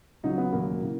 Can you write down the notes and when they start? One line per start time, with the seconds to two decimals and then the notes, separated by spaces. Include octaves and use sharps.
0.23 C#2 C#3 F#3 D#4
0.38 B3
0.52 E1 D#2 C#3 F#3 A#3
0.81 C#3 E3